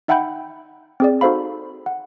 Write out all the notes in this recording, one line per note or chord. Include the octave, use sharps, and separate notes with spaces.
D#4 E5 F#5 G5 B5 G6
C4 G#4 D5
D#4 F#4 A4 C5 F5 B5
F#5